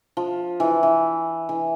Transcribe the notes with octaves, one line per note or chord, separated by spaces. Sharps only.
F3
E3
E3
E3